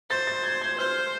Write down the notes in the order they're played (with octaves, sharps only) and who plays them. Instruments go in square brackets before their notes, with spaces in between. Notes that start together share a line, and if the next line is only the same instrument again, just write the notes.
[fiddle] C5 [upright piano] A6
[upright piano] A6
G#6
G#6
[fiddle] C5 [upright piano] F6